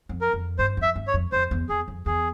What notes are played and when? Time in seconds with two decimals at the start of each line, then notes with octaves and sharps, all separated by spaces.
0.09 F2
0.21 A#4
0.33 F2
0.59 G2 C5
0.77 F2
0.82 E5
0.96 G2
1.07 C#5
1.14 F2
1.32 F2 C5
1.51 E2
1.69 E2 G#4
1.88 F2
2.06 E2 G#4